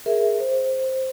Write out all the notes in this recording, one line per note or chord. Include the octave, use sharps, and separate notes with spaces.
G#4 A#4 E5
C5